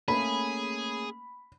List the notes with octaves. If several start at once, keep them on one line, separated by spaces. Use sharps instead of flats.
A3 A#3 C#4 G#4 B5